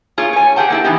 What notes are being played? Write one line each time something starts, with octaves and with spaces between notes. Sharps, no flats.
A#3 F4 G#4 C#5 F5
C#5 G#5
G4 G#4 A#4 F#5 G5 A5
A#3 E4 A4
E3 F3 B3 D#4 G4